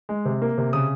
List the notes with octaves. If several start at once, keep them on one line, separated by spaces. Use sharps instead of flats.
G#3
C3
A#3
C3
C#3 D#6